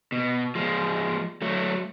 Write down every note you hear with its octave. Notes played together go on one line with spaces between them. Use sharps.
B2
F3 G#3
F#3 A3